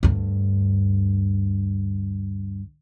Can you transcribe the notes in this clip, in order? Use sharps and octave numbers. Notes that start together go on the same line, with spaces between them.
D2 G2